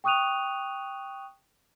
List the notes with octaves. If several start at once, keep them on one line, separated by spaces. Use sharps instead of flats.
G5 C#6 D#6 F#6 D#7 F7